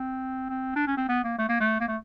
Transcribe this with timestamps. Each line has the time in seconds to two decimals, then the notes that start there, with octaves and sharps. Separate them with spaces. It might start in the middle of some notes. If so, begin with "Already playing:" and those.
Already playing: C4
0.49 C4
0.76 D4
0.87 C#4
0.97 C4
1.09 B3
1.24 A#3
1.38 A3
1.49 A#3
1.60 A3
1.80 A#3
1.88 A3